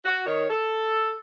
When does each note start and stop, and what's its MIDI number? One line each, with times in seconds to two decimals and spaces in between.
0.05 0.25 66
0.26 0.46 51
0.26 0.46 73
0.49 1.16 69